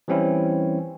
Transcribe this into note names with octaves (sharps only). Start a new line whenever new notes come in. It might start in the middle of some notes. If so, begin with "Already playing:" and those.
E3 G3 C4 C#4 E4